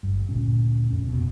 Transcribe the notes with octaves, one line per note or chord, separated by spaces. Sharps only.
G1 G2
D2 A#2 C#4
F2 C#4
F1 B2